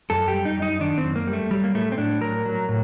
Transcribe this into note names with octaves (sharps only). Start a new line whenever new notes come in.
F#2 A4
G4
G3
D#4
F#2 D#4
D#3 D4
C4
F#2
A#3
G3
A3
F#3 G3
A#3
A2 A3
C4
A2 D4
F#3 A#4
F#3
A2